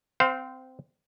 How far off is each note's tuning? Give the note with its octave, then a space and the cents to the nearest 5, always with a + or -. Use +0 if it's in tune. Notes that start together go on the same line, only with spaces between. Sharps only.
C4 -15 C5 -20 F5 +20